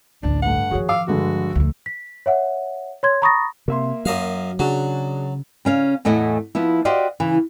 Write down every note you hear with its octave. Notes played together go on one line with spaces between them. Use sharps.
A1 D2 D4
G2 A3 F#5
D#3 F3 F#4 G#4 C#5
F5 D6 E6
G2 D3 G#3 F#4
D2 F3
B6
C#5 E5 F#5
C#5 C6 G#6
A#5 B5 C#6 D#6 A6 A#6
C3 A#3 E5 C6
F#2 F#3 D#5 F5
C#3 F#3 D4 F#4 G#4
C#3 C#4 F5
E2 A2 A3 D#5 F#5 G#5
F3 B3 E4
F#4 G4 C5 D5 D#5 F5
C#3 E3